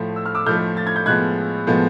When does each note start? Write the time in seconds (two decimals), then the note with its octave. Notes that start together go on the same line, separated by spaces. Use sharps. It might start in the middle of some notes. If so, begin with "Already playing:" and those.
Already playing: A2 F3 A3
0.16 E6
0.26 F6
0.35 D6 E6
0.46 A2 F3 A3 F6 G6
0.77 A6
0.87 G#6
0.96 G6
1.06 A2 F3 G#3 B3 F#6 G#6
1.67 A2 F3 G#3 B3